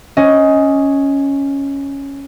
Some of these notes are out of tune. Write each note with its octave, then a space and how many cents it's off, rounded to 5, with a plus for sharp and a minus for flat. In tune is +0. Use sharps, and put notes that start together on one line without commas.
C#4 +0 D#5 +15